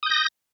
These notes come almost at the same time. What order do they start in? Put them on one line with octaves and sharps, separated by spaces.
D#6 G6 A#6